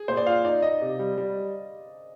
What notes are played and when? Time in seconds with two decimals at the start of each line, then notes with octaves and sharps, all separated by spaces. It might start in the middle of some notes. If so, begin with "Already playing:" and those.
Already playing: G#4
0.08 A#2 C5
0.17 D5
0.26 F4 F5
0.45 D#4 D5
0.62 D#4 D#5
0.81 C3
0.99 G3
1.17 G3